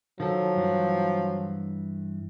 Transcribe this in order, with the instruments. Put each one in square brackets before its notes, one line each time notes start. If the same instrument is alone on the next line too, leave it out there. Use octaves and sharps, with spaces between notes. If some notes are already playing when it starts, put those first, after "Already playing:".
[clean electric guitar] D#3 A4 [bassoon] F3 [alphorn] F#3
[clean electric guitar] G2 E3